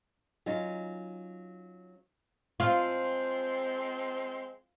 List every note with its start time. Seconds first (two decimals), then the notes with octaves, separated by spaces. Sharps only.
0.46 F#3 C#4 D#4 F4
2.60 F3 G#3 C4 F4